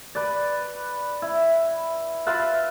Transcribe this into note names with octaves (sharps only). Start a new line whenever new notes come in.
B4 D5
E4
F4 B4 E5